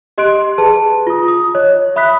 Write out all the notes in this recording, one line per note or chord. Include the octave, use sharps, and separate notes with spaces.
G4 D#5 C6 F#6 D7
G#4 B4 A5
F4 D#6
D#6
C#5 D#5
E5 B5 D#6 F#6 B6